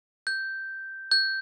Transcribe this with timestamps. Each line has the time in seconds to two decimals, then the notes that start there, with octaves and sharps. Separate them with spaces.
0.27 G6
1.12 G6